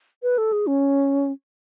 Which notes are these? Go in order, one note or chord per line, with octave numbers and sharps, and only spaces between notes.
B4
A4
G#4
C#4